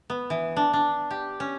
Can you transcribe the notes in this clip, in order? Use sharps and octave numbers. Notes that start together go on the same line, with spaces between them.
B3
E3
D4
D4
G4
C#4